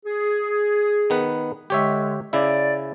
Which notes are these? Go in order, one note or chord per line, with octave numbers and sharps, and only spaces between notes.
G#4
D#3 B3 B4
D3 G#3 G4 C#5 E5
C#3 E4 D5